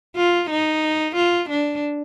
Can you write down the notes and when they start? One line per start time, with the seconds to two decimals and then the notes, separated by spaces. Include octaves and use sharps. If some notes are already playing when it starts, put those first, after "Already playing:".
0.16 F4
0.50 D#4
1.16 F4
1.50 D4